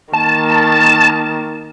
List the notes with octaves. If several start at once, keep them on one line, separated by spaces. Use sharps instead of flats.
D#3 A#3 A5